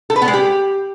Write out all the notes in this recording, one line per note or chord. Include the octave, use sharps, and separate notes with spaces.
A4
B4
B3
G#3
G4